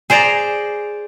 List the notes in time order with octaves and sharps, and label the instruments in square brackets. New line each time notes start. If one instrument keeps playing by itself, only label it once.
[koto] G#4 C5 D5 A#5